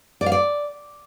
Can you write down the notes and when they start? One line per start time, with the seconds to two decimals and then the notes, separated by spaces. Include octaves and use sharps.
0.21 D5
0.26 F5
0.32 D5